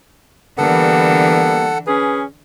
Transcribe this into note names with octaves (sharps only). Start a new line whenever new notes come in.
D3 E3 G3 A#3 B3 A4 F#5
C#4 G#4 B4